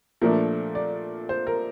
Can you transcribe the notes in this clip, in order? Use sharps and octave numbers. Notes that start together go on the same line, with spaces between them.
A#2 F3 A3 D4 A#4
D5
C5
A#4